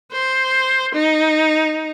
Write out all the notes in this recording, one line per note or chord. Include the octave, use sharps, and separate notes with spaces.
C5
D#4